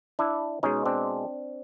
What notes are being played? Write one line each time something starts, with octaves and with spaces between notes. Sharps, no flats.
D4 E4
B2 G#3 C#4 D#4
C4 D4